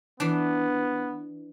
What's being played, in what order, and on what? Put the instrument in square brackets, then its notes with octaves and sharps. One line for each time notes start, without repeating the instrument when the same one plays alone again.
[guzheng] E3 D4 [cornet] B3